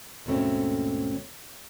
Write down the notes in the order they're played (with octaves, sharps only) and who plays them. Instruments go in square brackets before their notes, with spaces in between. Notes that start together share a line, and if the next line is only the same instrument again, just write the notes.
[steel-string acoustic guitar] D#2 G#2 B2 A3 C4 C#4